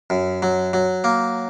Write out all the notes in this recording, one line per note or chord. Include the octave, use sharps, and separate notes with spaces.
F#2
F#3
F#3
A#3